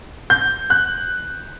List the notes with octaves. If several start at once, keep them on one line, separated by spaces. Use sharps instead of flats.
G6
F#6